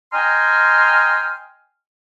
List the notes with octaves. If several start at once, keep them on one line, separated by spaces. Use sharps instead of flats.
D#5 G5 G#5 A#5 C6 F6